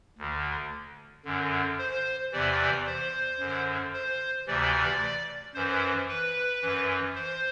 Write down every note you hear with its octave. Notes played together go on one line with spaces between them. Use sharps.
D2 D3
F#2 D3
C5
E2 C3 E3 D5
C5
F#2 D3
C5
D2 C3 E3 D5
F#2 E3 C5
B4
F#2 E3
C5